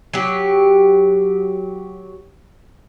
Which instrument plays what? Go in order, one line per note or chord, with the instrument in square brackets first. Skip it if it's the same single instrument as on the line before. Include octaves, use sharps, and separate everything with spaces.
[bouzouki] F#3 G4